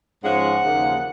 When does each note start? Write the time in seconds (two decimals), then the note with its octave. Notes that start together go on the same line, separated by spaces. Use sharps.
0.23 G#2 F3 G#3 C#4 F#5
0.62 D#2 C#3 F3 A#3 D#4